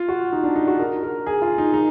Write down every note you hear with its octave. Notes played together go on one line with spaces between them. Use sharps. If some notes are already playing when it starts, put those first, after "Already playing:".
Already playing: F4
F#4
D#4
D4
D#4
F#4
A#4
A#4
G#4
F4
D#4
D#4